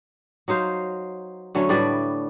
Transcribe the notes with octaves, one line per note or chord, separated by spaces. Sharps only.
F#3 D#4 C5 F5
D3 F#3 A3 C#4
A2 G3 B4 D5